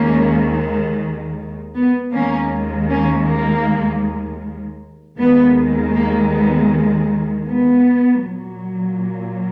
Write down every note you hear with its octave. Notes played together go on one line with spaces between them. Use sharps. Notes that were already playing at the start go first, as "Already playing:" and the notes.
Already playing: D#2 D#3 G#3 A#3 C#4
B3
D#2 D#3 G#3 A#3 C#4
A#3 C#4
A#3
D#2 D#3 G#3 B3
A#3
B3
B3
A#2 F#3